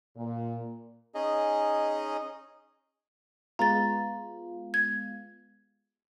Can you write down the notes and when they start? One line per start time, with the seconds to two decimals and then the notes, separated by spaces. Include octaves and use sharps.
0.16 A#2
1.15 C#4 D#4 G#4 D#5
3.59 G#3 B3 F4 A#5 A6
4.74 G#6